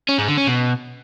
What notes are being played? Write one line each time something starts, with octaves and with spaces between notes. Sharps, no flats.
C#4
G#2
D3
C#4
B2